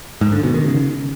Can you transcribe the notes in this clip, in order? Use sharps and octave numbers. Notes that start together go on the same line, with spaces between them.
G#2
D3
B2
D#3
C#3